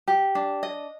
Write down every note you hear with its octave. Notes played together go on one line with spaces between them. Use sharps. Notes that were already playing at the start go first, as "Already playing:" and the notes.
G4
D4
D#5